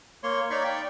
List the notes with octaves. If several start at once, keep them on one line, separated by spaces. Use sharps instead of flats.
A#3 C#5 C6
D#4 C#5 D5 F5 B5 C#6
D5 G5